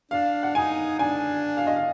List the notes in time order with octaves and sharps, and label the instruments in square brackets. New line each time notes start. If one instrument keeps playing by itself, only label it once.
[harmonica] D4 [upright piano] F5
[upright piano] F#5
[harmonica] D#4 [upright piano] G#5
[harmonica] D4 [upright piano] G#5
[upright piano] F5
D#5
F5